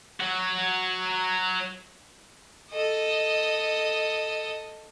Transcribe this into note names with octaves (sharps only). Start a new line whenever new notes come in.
F#3 F#4
A4 D#5